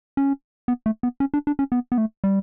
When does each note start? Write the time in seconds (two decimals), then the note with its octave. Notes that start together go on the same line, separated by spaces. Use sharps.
0.17 C#4
0.68 B3
0.86 A3
1.03 B3
1.20 C#4
1.34 D4
1.47 D4
1.59 C#4
1.72 B3
1.92 B3
1.98 A3
2.24 G3